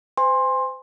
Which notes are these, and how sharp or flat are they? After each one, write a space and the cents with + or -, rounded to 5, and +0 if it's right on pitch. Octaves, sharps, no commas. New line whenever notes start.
C5 -35 G#5 -30 C6 +15